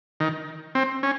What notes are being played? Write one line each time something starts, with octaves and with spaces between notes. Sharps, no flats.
D#3
C4
C#4